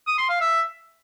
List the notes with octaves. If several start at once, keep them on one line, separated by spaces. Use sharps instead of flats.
D#6
C6
F5
E5